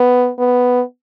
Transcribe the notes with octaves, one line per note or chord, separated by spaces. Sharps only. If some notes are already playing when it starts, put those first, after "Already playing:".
Already playing: B3
B3